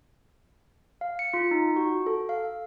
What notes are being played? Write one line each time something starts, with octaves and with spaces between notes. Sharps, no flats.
F5
C#7
F4
D#4
F#4
A4
F5